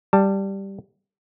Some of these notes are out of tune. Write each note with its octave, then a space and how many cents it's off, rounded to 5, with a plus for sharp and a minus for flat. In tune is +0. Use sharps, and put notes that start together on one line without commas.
G3 +0 A5 +15